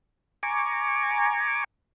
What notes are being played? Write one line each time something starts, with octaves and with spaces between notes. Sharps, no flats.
G#5 A#5 C#6 D6